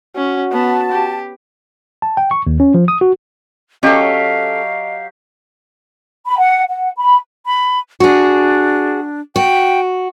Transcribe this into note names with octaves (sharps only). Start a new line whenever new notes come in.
C#4 F#4
B3 A5
G4
A5
G5
C#6
D#2
C#4
F3
D#6
F#4
F#3 C#4 G4 A4 D#5 F5
B5
F#5
F#5
B5
B5
D4 F#4 G#4
F#4 G5